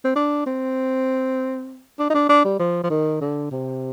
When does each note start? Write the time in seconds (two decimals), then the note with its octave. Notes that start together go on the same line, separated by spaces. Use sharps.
0.04 C4
0.16 D4
0.46 C4
1.99 D4
2.10 D#4
2.14 D4
2.29 D4
2.45 G3
2.59 F3
2.84 F3
2.90 D#3
3.21 D3
3.51 C3